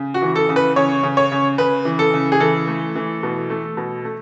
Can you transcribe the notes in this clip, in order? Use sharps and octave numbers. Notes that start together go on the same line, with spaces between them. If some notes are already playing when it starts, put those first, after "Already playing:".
Already playing: C#3
F#4
E3
A4
C#3
B4
C#3 C#5
C#3
C#5
C#3
C#3 B4
E3
A4
C#3
G#4
E3 A4
A3
E3
B2
A3
B2
A3